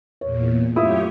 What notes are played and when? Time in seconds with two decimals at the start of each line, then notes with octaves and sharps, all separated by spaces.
0.21 E2 A#2 C#5
0.76 F#2 A3 E4 F4 G4 C#5 D#6